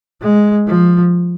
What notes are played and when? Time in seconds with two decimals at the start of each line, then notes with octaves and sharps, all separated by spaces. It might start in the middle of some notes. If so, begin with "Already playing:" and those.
0.22 G#3
0.67 F3